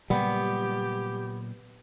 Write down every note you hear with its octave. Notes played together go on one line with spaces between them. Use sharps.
A#2 C#3 F#3 G3 B3 G4